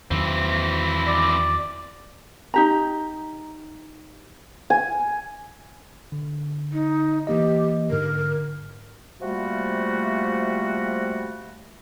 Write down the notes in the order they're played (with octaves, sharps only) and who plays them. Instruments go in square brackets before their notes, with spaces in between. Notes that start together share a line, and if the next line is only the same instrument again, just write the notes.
[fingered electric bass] E2 D#3 F#3 [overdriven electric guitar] E3 C4
[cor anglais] D5
[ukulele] D#4 G4 A#5
[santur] G#5
[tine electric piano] D3
[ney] D#4
[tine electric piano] E3 A#3 D#5 [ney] G4
[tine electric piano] G#2 D3 [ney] A#4
[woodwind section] C3 F3 G3 A3 A#3 F#4